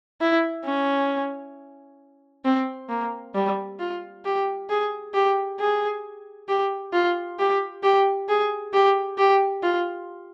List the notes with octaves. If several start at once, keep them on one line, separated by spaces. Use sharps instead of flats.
E4
C#4
C4
A#3
G3
F4
G4
G#4
G4
G#4
G4
F4
G4
G4
G#4
G4
G4
F4